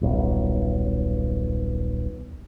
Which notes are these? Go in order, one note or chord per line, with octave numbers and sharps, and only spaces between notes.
D#1 B1